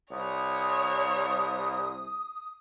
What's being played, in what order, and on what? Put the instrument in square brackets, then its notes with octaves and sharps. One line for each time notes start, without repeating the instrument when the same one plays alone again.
[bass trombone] C2 [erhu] C#5 [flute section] D#6